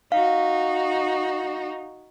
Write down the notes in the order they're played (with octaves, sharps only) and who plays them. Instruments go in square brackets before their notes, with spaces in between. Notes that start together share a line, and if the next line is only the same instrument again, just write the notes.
[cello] D#4 F#4 [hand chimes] F5